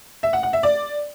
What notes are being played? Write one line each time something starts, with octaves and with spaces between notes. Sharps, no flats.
E5
F#5
F#5
E5
D5